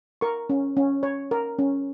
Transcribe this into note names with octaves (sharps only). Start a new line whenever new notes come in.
A#4 C#6
C#4
C#4
C#5
A#4
C#4